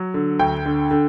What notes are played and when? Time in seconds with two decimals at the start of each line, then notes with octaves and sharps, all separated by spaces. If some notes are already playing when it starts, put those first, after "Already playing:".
Already playing: F#3
0.14 D3
0.39 D2 G5
0.66 D3
0.91 D3